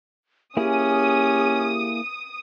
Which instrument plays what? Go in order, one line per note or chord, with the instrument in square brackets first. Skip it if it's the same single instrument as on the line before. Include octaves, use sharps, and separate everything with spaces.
[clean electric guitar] A#3 E4 G#4 [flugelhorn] C#4 [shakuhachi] G4 [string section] D#6